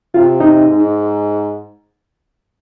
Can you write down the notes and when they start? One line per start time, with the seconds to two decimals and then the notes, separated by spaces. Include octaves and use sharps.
0.14 C3 F4
0.40 D#4
0.66 G#2